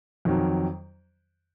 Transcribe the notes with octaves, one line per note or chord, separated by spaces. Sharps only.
F2 D#3 F#3